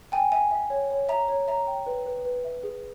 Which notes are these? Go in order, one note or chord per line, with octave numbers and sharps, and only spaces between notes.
G5 G#5
E5 G#5
E5
C#5
C#5
E5 A#5
C#5
E5 A#5
G5
B4
B4
B4
E5
G#4